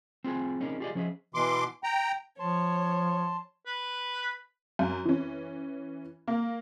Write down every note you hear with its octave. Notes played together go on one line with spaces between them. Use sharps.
C4 F4 G#4 G#5
C4 C#4 D#4 G#4 A#4
F4 G4 G#4 C5 D5 D#5
F3 C#4 G#4 D#5 E5
B2 E3 C6 D6
G5 A#5
F3 C#5 A5 C6
B4
F#2
E3 C#4
A#3